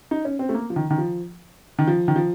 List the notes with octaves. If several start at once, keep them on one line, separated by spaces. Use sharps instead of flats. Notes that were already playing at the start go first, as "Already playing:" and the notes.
D#4
C#4
C4
A3
A#3
F3
D#3
D#3
F3
D#3
F3
D#3
F3